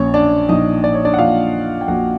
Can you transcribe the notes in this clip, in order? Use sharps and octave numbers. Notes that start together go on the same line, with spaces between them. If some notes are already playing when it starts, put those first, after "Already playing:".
Already playing: A#1 A#2 C#4 C#5
D4 D5
A#1 A#2 D#4 D#5
D5
C#5
D4 D5
F#5
A#1 A#2 F4 F5
G5
A#1 A#2 F#4 F#5